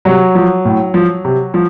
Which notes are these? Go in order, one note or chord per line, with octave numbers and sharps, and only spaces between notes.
C3 F#3
F3
A2
F3
C3
F3